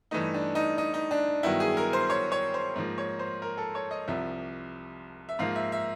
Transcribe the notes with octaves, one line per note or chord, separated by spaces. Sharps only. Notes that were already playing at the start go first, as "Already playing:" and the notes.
G2 E3 A3 D#4
D4
D#4
D#4
D#4
D4
G2 D#3 F#3 B3 E4
G#4
A#4
C5
C#5
C#5
C5
G#2 F3 A#3
C#5
C5
A#4
A4
C#5
D#5
C2 C3 F3 E5
E5
G#2 F3 A#3 F5
E5
E5